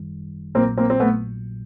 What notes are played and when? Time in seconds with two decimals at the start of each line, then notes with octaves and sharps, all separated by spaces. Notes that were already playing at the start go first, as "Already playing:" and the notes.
Already playing: G1 F#2 D#3 G3
0.55 A#1 A#2 F#3 A#3 C4
0.77 A#3 C4
0.90 C4
1.00 A3 B3